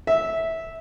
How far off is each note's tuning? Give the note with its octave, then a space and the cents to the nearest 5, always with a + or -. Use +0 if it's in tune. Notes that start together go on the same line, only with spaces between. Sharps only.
E5 -15